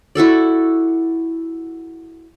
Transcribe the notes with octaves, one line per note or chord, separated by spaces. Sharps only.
E4 F#4 A4 D5